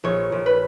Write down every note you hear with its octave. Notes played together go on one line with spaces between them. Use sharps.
A#1 C#5
A#1
B4